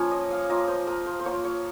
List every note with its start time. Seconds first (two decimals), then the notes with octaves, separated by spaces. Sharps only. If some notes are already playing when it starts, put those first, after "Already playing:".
Already playing: F3 A#3 C#4 F4 A#4 C#5
0.11 D#5
0.30 F5
0.49 A#3 F4 D#5
0.68 C5
0.87 A#4
1.06 C5
1.20 C5
1.25 A#3 F4 C#5
1.44 C#5